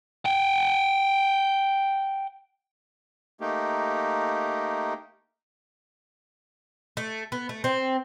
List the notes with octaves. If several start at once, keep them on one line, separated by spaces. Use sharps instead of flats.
F#5 G5
A3 A#3 D#4 G4
A3
B3
A3
C4